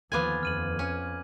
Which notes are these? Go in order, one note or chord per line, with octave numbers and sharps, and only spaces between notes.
D#2 D3 F3 B3 F4 G#5 D6 G#6
F2 F6 D#7 F#7
C#4